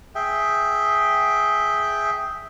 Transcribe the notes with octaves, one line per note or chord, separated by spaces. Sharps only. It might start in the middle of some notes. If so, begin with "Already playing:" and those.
G#4 E5 G5